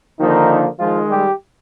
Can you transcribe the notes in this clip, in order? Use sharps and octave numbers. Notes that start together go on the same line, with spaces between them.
D3 D#3 F3 A#3 D#4
D#3 F3 G#3 F4
G3 G4